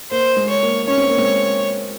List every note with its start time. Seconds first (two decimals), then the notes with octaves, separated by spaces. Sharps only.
0.11 A#3 C5
0.37 G#3
0.50 C#5
0.63 A#3
0.87 C#4 C#5
0.97 C4
1.09 A#3
1.18 G#3 C4